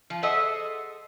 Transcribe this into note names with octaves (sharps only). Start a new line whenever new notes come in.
F3
G#4 A4 C5 D#5 E5 F#5